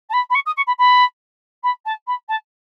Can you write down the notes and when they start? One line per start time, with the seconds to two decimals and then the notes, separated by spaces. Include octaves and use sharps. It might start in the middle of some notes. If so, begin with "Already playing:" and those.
0.09 A5
0.13 B5
0.30 B5
0.34 C#6
0.46 D#6
0.56 C#6
0.67 B5
0.78 B5
1.63 B5
1.85 A5
2.07 B5
2.28 A5